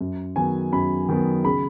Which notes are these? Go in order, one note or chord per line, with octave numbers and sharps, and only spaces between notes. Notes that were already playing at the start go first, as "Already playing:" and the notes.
F#2
D#3 F#3 B3 G#5
F#2 B5
D#3 F#3 B3
C#3 B5